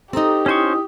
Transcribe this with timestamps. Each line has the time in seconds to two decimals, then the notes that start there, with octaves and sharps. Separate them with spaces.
0.13 C4 D#4 G4 A4 A#5 D#6
0.46 C#4 E4 C5 C#6 D#6